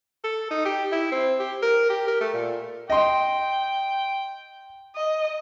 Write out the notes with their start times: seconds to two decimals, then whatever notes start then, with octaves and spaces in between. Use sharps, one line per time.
0.24 A4
0.51 D#4
0.65 G4
0.92 E4
1.12 C4
1.39 G4
1.63 A#4
1.90 G4
2.08 A#4
2.21 A3
2.33 A#2
2.90 D#5 G5 C6
4.96 D#5